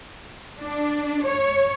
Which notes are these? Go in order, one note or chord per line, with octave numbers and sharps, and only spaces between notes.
D4
C#5